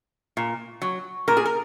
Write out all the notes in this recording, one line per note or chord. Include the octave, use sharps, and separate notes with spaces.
A#2
F#3
A#2 A#4
G#4
A#4